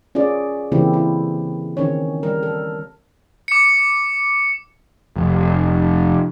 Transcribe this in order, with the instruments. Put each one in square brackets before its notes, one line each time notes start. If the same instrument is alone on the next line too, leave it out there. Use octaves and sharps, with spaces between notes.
[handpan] C#4 F4 G#4 D5
C#3 E3 A#3 C4 E4 G4
E4
D#3 C4 C#4 C#5
G3 A#4
A4
[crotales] D6 C#7
[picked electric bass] F1